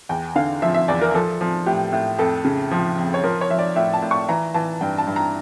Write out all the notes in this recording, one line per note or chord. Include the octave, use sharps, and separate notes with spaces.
E2 G5
D3 F5
F3 E5
E5
E2 D5
A#4
F3 A4
F3
A2 G4
A2
F2 A4
C#3
F3
F2
C#5
F3 A#4
C#5
F3 E5
D5
A2 E5
A5
A2
C#6
E3 A#5
E3 A5
G2 G5
A5
G2
A#5